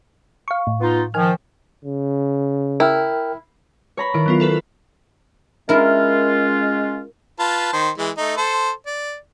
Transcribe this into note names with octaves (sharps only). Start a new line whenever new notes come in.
F5 C#6
A2
B3 D#4 F4
D#3 F3 G#5 F6
C#3
E4 A#4 G5 F6
C#5 A#5 B5
D#3 E4 D7
F#3 B3 F4
F4 A4 B4
G#3 C#4 E4 F4 A#4
F4 B4 A5
D#3 C5
E3 G#3
A3 D#4
A4 C5
D5